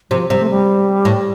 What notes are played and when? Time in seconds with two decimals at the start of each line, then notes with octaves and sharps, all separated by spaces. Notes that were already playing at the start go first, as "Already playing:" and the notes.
0.11 C3 F3
0.30 C3 G3
0.40 A3
0.50 G3
1.05 A2